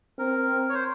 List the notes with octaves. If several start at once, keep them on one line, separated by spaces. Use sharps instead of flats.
C4 A#4
C#5
C5